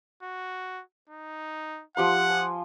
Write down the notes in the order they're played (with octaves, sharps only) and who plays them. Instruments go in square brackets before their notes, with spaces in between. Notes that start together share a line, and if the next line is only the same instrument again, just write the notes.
[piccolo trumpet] F#4
D#4
[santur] F3 G4 C6 [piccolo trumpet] F#5
[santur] G#5